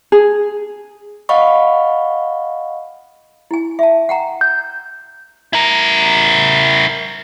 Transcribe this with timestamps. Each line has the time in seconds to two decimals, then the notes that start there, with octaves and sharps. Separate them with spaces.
0.12 G#4
1.29 D#5 F5 F#5 B5 C#6
3.51 E4 G#5
3.79 E5 A5
4.09 F#5 G5 A#5
4.41 G6
5.53 E4 A#4